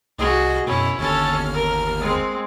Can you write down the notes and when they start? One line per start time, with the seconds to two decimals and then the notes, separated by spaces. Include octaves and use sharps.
0.19 C2 F#4 G#4 D#5
0.67 F#2 B2 C#4 E4
0.98 G1 D#2 C#4 A4 F6
1.54 A#4
2.00 G#3 C4